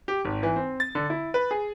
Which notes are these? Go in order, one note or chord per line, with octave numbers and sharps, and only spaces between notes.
G4
G#1
E3
C4
A6
D3
E4
B4
G#4